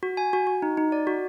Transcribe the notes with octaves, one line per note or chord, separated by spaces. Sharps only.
F#4
G#5
F#4
F#4
D#4
D#4
D5
F#4